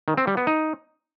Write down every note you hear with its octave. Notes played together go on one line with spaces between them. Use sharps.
D#3
C4
G3
B3
D#4